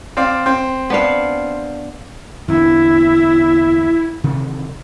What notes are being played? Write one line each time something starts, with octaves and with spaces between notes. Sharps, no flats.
C4 D5 F5
C4
B3 D4 F5
E2 D3 B3 E4
C3 D#3 E3